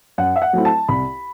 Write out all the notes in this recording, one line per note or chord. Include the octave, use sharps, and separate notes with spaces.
F#2 F#5
E5
F#5
F#3 A3 C4 E4
A5
C2 B5